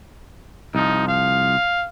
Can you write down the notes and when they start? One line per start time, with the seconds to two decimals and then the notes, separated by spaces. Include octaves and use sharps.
0.75 C2 F3 D#4
1.08 F5